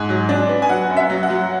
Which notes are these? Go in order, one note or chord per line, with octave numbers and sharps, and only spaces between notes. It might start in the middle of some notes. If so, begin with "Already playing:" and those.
Already playing: G#2 G#5
F#3
D4
B3
G#5
F#3 F#5
F#2
E5
F#3
F#5
F#3